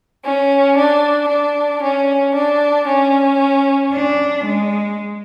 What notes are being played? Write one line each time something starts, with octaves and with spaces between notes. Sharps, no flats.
C#4
D4
D4
C#4
D4
C#4
D4
G#3